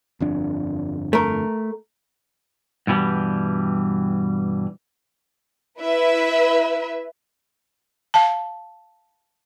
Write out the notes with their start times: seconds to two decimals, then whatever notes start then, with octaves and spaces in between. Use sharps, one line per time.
0.20 G1 F2 D4
1.13 A3 A#4
2.87 G2 B2 E3 G3
5.79 E4 B4 E5
8.14 F5 A5